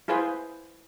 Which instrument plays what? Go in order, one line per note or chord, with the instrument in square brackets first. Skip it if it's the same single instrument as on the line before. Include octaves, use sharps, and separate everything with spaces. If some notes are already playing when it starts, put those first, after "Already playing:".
[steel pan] E4 F4 G#4 B4 C5 G#5